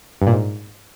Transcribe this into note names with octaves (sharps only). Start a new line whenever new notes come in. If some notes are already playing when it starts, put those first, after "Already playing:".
G2
A#2
G#2